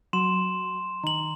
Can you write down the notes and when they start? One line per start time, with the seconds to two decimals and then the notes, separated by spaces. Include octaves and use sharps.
0.13 F#3 C6 E7
1.04 D#3 A#5 F#7